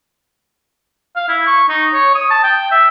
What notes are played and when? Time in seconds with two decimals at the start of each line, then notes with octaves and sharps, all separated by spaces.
1.16 F5
1.29 E4
1.47 C#6
1.69 D#4
1.93 C#5
2.15 D#6
2.30 A5
2.44 G5
2.72 E5